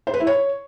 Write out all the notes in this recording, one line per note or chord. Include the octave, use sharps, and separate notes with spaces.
C5
B4
E4
C#5